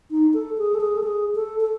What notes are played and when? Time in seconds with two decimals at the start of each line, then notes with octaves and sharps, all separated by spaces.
0.11 D#4
0.34 A4
0.58 G#4
0.74 A4
0.81 G#4
0.97 A4
1.03 G#4
1.35 A4
1.60 A4